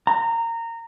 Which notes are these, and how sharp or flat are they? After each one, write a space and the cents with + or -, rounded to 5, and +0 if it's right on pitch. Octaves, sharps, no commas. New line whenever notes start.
A#5 -20